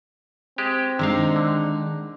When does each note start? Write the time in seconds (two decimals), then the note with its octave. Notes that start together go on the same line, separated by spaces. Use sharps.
0.58 G#3 C4 G4
0.99 C3 D#3 G#3 D4 D#4 F5
1.36 D3